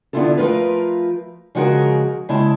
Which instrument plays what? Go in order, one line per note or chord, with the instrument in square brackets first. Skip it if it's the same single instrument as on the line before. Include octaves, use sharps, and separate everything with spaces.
[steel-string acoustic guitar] D3 B3 D4 E4 F4 A4
F3 A3 F4 A#4 B4
C#3 F3 G#3 F#4 G#4 A#4
C#3 G#3 E4 A5